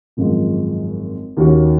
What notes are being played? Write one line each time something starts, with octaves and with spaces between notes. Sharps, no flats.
G#1 F#2 F3 G#3
D#2 D#3 A#3 C#4 F#4